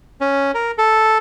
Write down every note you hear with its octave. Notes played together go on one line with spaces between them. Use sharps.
C#4
A#4
A4